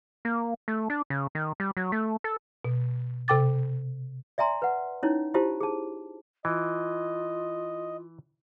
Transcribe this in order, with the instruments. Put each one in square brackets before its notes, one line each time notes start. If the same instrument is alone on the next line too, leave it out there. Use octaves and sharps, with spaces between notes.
[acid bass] A#3
A3
D4
C#3
D#3
G3
F#3
A3
A4
[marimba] B2
C3 A4 G5 D6 A6
[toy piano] D5 E5 G#5 A#5 C6
B4 F#5
C#4 D#4 E4 C#5
E4 F4 G4 C5 A5
G#4 A5
[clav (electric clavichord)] E3 [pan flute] F4 [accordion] D#5